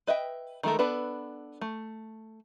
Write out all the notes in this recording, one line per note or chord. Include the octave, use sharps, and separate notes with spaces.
B4 D#5 E5 G5
D#3 G#3 A3 A4 A#4
B3 D4 A4 B4
A3